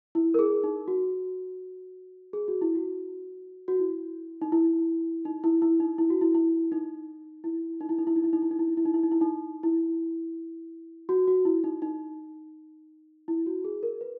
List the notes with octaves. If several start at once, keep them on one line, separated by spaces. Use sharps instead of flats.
E4
A#4
G#4
D#4
F#4
G#4
F#4
E4
F#4
F#4
E4
D#4
E4
D#4
E4
E4
D#4
E4
F#4
E4
E4
D#4
E4
D#4
E4
D#4
E4
D#4
E4
D#4
E4
D#4
E4
D#4
E4
D#4
E4
D#4
E4
D#4
E4
F#4
F#4
E4
D#4
D#4
E4
F#4
G#4
A#4
B4